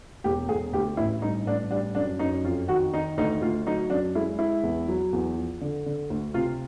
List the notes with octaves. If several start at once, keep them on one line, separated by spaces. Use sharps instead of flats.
E1 G4
E1 G#4
D2 G4
A1 E4
G2 D#4
A1 D4
G3 D4
F#2 D4
F#2 D#4
F2 F4
D#3 F#4
D#3 D#4
D2 D#4
D2 F4
F#3 D#4
F#2 D4
G#3 E4
G#3 E4
E2
F#3
E2
F3
D3
D3
D2
C3 F4